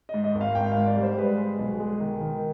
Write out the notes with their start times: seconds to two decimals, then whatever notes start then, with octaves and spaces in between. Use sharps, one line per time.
0.09 G#2 D#5
0.24 D#5
0.35 G#1
0.41 F5
0.55 G#1 G5
0.72 G#2 F5
0.86 D5
0.96 G3
1.03 C5
1.18 G#3 B4
1.38 G#3
1.59 B1
1.80 G#3
2.00 D#3
2.21 D#3